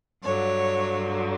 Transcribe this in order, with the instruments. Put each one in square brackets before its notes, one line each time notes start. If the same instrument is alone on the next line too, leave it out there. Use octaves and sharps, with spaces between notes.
[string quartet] G2 D3 F#3 C#5